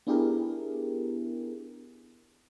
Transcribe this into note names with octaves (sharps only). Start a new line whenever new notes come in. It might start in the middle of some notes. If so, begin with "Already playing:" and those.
B3 D4 E4 G4 G#4 A#4